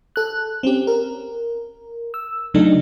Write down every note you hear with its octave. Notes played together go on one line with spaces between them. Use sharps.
A4 F#6
C4 C#4 G4
A#4
E6
C#3 F#3 A3 D4 D#4